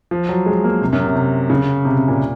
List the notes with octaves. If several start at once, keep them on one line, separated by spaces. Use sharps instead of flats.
F3
F#3
G#3
A#3
C3
F#2
C3
C3
C#3
C3
C3
A#2